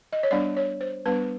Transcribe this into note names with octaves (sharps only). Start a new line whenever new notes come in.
D#5
C#5
G3 B3 D4 D5
C#5
C5
G3 B3 D4 B4